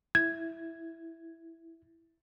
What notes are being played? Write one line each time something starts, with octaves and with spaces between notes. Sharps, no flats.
E4 G#6